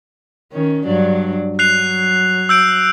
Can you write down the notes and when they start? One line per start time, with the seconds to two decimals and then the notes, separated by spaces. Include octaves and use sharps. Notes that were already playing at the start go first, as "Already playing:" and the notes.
0.53 D#3 C#4
0.86 G2 F#3 D4
1.59 F#3 F#6 C7 F7
2.49 E6 G6 D7